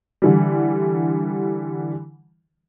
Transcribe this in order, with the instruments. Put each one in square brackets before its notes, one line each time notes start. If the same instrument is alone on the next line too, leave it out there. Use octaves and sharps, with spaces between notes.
[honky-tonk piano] D3 E3 G3